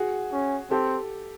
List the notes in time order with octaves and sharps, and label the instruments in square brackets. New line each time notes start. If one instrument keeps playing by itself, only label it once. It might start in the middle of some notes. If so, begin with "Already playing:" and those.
Already playing: [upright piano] F#4 G#4
[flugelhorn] C#4
[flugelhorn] C4 [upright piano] G4 A4